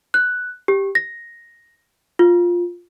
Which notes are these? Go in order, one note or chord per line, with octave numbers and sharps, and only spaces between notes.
F#6
G4
A#6
F4